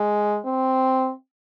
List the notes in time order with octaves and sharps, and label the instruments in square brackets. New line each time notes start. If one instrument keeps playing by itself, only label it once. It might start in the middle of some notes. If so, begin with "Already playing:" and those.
Already playing: [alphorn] G#3
C4